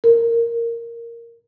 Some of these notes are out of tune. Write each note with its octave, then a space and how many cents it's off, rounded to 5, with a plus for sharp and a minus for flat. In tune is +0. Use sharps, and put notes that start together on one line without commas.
A#4 -5